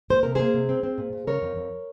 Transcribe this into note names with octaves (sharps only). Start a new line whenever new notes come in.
A#3 C5
C3 A#4
A#3 G#4 C5
C3
C4
C4
A#2
A#2
C#3 A#4 C#5
F2
F2